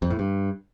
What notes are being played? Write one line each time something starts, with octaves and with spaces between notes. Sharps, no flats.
F2
A2
G2